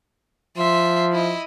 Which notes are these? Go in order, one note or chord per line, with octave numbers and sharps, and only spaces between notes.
F3 E5 C6
E4 D#5